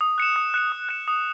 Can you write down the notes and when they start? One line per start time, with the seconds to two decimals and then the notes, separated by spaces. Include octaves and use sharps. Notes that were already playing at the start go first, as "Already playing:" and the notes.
0.01 D#6
0.18 F#6 C#7 E7
0.36 D#6
0.54 F#6 C#7 E7
0.72 D#6
0.89 F#6 C#7 E7
1.08 D#6